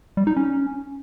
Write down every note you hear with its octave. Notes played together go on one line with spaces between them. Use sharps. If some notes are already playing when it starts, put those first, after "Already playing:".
G3
D#4
C#4